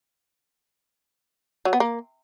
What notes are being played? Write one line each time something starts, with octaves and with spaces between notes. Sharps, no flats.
F#3
B3
A#3